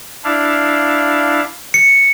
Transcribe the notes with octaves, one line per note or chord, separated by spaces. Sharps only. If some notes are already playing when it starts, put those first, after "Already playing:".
D4 E4 F5
C#7